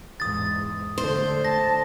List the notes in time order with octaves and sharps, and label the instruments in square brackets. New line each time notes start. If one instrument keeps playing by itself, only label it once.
[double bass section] E2 G#2 [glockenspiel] D#6 A6
[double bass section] D3 A3 [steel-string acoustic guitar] C5
[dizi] A5 [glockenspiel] A#6